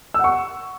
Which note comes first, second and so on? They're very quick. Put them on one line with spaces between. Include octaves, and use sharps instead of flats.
E6 F#5 C#6